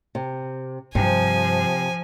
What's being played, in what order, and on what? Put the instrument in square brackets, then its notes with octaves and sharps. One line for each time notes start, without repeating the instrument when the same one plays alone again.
[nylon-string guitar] C3
[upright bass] G2 [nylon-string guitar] C3 [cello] F3 [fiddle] G#5